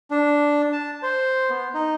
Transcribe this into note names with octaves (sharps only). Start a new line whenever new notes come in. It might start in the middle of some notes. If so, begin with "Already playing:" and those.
D4
A5
C5
B3
D#4